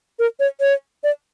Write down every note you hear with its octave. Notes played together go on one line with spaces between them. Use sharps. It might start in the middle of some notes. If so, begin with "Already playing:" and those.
A#4
C#5
C#5
D5